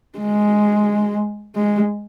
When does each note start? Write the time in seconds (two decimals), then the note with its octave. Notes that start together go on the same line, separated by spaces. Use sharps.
0.19 G#3
1.56 G#3